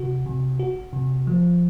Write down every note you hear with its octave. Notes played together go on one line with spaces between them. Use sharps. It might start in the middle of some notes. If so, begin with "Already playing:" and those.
Already playing: C3 F#4
C3
F#4
C3
F3